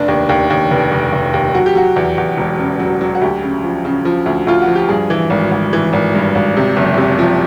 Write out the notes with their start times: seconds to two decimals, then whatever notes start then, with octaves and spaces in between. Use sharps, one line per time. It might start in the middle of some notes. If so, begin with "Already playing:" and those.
Already playing: F1 D4
0.08 D#2
0.29 D#2
0.50 D#2
0.71 F1
0.92 F1
1.12 F1
1.34 D#2
1.54 F#3 F#4
1.66 G4
1.75 F#3 F#4
1.96 E2
2.18 E2
2.37 E1
2.58 C#3
2.80 F#3
3.01 F#3
3.15 F#4
3.21 D2 G4
3.43 C#3
3.64 F3
3.85 C#3
4.05 F3
4.26 D2
4.47 D2 F4
4.62 F#4
4.68 F3
4.75 G4
4.89 G2 G#4
5.10 E3
5.30 G#1
5.51 G#1
5.73 E3
5.93 G#1
6.15 G2
6.35 G#1
6.57 C3
6.77 F#1
6.98 C3
7.19 F3